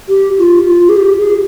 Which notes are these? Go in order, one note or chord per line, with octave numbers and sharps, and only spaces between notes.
G4
F4
F4
G#4
G4
G#4